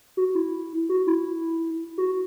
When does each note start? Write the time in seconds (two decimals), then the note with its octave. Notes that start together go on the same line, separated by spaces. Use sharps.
0.17 F#4
0.35 E4
0.89 F#4
1.07 E4
1.98 F#4